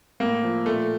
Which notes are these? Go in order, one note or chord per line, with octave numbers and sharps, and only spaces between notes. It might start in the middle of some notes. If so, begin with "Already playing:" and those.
A2 A#3
F3
A#2 A3